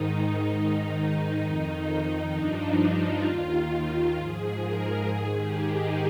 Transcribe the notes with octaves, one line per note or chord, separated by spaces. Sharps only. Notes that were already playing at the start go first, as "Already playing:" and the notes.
Already playing: G#2 D#3 D#4
G#2 D#3
F2 D#3
G2 F3 D4
D#4
F4
D#2 D#3
G#2 F3 G#4
A#4
G#2 D#3 G#4
G4
D#4